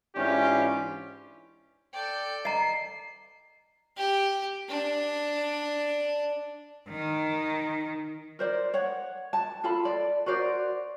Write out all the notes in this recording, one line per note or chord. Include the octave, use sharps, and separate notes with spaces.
G#2 E3 C#4 D4 F4 G4
A4 D5 G5
D#5 A#5 C7
G4
D4
D#3
A#4 C5 D5
C#5 F#5
A5
F4 A4 A5 B5
D5
F#4 A#4 C5 D5